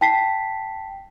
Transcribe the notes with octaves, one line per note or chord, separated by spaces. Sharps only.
G5 A5 B6 C7